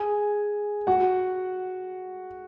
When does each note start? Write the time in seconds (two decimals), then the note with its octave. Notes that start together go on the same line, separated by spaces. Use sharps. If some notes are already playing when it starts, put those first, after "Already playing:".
Already playing: G#4 G#5
0.87 F#4 F#5